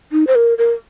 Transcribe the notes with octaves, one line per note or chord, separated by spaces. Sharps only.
D#4
C5
A#4
A#4